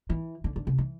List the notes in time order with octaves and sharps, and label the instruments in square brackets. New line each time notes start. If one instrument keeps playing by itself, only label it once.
[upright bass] E3
D3
D3
C3
E3